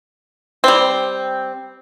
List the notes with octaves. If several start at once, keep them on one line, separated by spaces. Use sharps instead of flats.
G3 C4